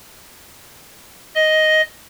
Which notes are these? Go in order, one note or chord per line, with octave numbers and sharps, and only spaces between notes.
D#5